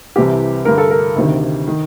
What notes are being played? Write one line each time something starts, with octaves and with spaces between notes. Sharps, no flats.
C2 C3 E3 G4
G2 D3 A#4
A4
A#4
D2 C3 D#3
D#3